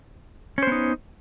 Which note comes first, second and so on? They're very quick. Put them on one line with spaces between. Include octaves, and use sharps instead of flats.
C#4 C5 B3 D#4